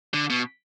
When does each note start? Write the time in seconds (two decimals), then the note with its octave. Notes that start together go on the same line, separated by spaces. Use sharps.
0.14 D3
0.30 B2